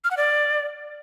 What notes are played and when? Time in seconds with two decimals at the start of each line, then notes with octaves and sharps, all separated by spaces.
0.04 F6
0.11 F#5
0.17 D5